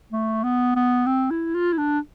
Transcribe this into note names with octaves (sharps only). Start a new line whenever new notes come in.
A3
B3
B3
C4
E4
F4
E4
D4